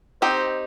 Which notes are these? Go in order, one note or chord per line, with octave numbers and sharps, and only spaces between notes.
C4 D#4 G4 C5